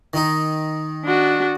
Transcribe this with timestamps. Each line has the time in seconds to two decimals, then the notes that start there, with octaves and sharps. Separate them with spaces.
0.13 D#3 D#4
1.05 D4 F#4